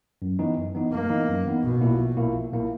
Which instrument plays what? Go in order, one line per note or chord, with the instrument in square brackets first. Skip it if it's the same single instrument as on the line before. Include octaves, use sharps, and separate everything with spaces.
[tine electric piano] F#2
E3 B3 D#4
F#2
E3 B3 D#4
[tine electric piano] F#2 [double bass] A#3
[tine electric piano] E3 B3 D#4
F#2
E3 B3 D#4
[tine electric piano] A#1 [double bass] B2
[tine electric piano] A#2 A#3 E4
A#1
A#2 A#3 E4
A#1
A#2 A#3 E4